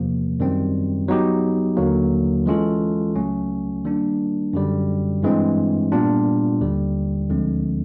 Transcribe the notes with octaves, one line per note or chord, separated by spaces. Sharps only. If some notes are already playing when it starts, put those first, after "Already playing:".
Already playing: E2 C3 F3 A#3
F#2 D#3 G3 C4
F#3 B3 D#4 G4
D#2 D3 F#3 A#3
E3 G#3 C#4 F4 A4
C#2 C#3 F#3 A3 C#4
D#3 G3 A#3 D4
F#2 D3 G3
G2 E3 G#3 C4
A#2 G3 B3 D4 F4
D#2 D3 G3
D2 D3 F3 G#3 C4